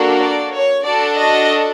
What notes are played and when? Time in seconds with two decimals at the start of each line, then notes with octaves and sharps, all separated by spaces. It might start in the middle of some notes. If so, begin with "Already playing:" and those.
Already playing: A#3 D4 F#4 A4
0.20 D5
0.53 C#5
0.85 D4 F#4 A4 D5
1.18 D#5